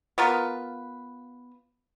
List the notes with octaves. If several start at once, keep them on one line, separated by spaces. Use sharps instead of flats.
B3 F4 A#4 B4